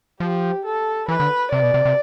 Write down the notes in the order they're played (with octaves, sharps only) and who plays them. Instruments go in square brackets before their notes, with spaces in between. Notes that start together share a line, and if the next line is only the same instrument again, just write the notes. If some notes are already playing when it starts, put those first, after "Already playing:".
[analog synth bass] F3 [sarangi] G4
[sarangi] A4
[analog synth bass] E3 [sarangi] B4
[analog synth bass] D3
[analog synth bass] C3 [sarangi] D5
[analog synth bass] B2
C3
C3